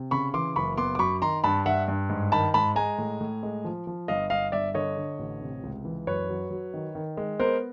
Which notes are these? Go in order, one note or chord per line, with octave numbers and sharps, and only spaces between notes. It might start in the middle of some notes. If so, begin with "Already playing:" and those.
Already playing: C3
C#3 B5 C#6
E3 C6 D6
F#1 B5 C#6
B3 C6 D6
D6
F#2 B5 C#6
D#3 A#5 C6
G2 A5 B5
G2 E5 F#5
G2
G#2
D#3 A5 B5
G#2 A5 B5
G#3 G#5 A#5
A2
A2
G#3
F3
F3
G1 D#5 F5
G1 D#5 F5
G1 D5 E5
D3 C#5 D#5
D3
A1
C3
C#2
E3
F#2 B4 C#5
F#3
F#3
D#3
D#3
G#3
B3 A#4 C5